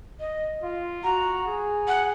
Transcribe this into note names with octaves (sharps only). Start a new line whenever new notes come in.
D#5
F4
F#4 A#5
G#4
F#5